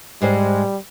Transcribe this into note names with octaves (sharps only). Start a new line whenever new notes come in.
G#2 G3 G#3 C5